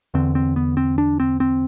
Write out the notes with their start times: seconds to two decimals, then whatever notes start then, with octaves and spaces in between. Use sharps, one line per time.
0.14 E2 D3 C4
0.35 C4
0.56 B3
0.77 C4
0.98 D4
1.20 C4
1.40 C4